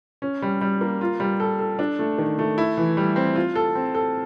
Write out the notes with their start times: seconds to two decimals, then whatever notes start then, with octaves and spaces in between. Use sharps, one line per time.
0.22 C#4
0.42 G3
0.61 G3
0.81 A#3
1.01 F4
1.20 G3
1.40 A4
1.59 A4
1.79 D4
1.99 A3
2.18 D#3
2.39 A3
2.58 E4
2.77 E3
2.97 G3
3.16 C4
3.36 F4
3.55 A4
3.75 C4
3.94 A4